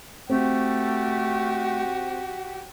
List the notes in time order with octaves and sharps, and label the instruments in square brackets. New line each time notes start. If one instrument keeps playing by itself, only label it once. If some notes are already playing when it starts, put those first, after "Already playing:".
[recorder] A3 [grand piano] C4 [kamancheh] F#4 G4